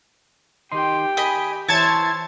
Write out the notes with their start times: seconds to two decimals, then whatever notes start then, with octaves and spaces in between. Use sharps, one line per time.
0.72 D#3 G4 D#5 G5 C6
1.17 G#4 D#5 G#5 B5
1.69 E3 C5 C#5 E5 A5 G#6 A6